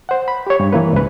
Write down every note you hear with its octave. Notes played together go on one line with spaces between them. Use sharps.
C5 F#5
B5
G4 C#5
G2
E3 A#3 B4
C#2 G#2 B4